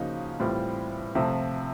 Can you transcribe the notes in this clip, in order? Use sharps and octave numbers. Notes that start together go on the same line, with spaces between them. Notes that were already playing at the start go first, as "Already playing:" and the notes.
Already playing: C#3 F3 A#3 D#4 F#4
A2 E3 G3 C4 F4
C3 F3 A3 C4